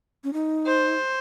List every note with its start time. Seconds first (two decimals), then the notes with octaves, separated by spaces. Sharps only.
0.24 C#4
0.33 D#4
0.67 C5